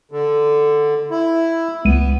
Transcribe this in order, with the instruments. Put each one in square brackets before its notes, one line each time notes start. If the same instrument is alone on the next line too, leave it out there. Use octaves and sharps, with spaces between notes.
[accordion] D3
E4
[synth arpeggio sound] C#2 D#7 [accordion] B3